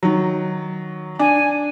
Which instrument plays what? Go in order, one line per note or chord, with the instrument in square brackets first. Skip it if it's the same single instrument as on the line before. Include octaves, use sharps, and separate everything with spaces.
[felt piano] D#3 F#3
[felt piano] D4 [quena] G#5